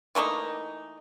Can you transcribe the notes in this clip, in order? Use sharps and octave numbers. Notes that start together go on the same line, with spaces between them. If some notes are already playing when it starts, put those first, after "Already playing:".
E3 A3 A#3 D#4